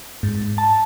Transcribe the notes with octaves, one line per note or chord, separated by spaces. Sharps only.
G#2
A5